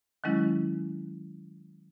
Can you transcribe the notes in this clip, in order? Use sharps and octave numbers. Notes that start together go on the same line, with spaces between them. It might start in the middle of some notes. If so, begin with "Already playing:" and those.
D#3 F#3 G#3 C#4 E4